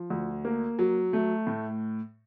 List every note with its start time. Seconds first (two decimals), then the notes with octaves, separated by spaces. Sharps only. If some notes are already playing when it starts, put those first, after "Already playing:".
Already playing: F3
0.10 D2
0.45 A#3
0.79 F#3
1.13 A3
1.47 A2